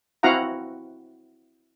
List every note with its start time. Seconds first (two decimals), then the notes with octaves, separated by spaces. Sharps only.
0.23 C4 E4 F#4 F5 F#5 A#5